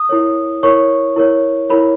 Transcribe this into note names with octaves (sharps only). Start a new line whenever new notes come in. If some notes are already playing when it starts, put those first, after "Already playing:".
Already playing: D#6
E4 A#4 C#5
E4 A#4 C#5 C#6
E4 A#4 C#5
E4 A#4 C#5 B5